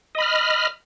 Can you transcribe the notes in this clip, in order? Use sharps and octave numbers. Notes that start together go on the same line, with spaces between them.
D#5 B5 F6